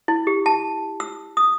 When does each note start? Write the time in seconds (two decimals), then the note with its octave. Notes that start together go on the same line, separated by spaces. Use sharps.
0.08 E4
0.27 G4
0.46 A5
1.00 E6
1.37 D#6